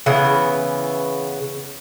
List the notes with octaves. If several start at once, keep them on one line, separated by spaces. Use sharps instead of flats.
C#3 E3 B3